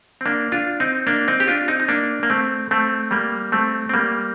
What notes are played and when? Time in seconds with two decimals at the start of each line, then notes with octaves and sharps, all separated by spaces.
0.21 C4
0.26 A#3 D4
0.52 D4 F4
0.80 C4 D#4
1.07 A#3 D4
1.28 C4 D#4
1.40 G4
1.48 D4 F4
1.68 C4 D#4
1.80 D#4
1.89 A#3 D4
2.23 A#3
2.30 A3 C4
2.71 A3 C4
3.11 G3 A#3
3.52 A3 C4
3.89 C4
3.94 G3 A#3